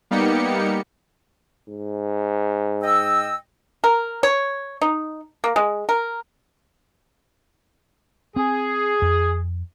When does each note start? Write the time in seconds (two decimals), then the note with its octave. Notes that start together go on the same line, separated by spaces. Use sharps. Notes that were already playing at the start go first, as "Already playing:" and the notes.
0.11 G3 A#3 B3 D#4 G4 C#7
1.69 G#2
2.83 D#5 G5 E6
3.84 A#4
4.23 C#5
4.82 D#4
5.44 A#3
5.56 G#3
5.89 A#4
8.36 C4 G#4
9.02 F2